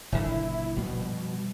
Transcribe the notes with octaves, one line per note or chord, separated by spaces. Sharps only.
F#1 A#2 D3 E4
B2 F3 G3